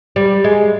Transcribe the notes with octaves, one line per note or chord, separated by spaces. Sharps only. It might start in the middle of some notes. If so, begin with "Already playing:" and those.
G3
G#3